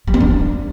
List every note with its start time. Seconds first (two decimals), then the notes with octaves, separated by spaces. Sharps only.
0.08 G3
0.14 C4
0.20 D4